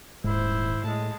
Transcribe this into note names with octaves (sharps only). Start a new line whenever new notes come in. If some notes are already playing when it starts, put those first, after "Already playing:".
D#1 G#2 E4 C5
A2 G#3 A5